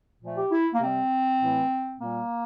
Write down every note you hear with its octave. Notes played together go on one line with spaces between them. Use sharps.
A#2 F3 A3
G4
E4
A#3
C3 G3 C4
A2 E3 A3
A#2 G3 A#3